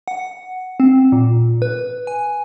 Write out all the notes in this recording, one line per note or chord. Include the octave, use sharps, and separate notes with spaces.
F#5
C4
A#2
B4
G#5